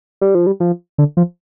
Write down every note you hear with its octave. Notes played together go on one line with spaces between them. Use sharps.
G3
F3
G3
F3
D3
F3